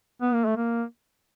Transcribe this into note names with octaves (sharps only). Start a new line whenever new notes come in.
B3
A#3
A3
A#3